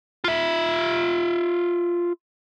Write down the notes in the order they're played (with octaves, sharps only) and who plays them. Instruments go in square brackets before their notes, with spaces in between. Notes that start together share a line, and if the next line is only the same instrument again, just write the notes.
[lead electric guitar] F4 E5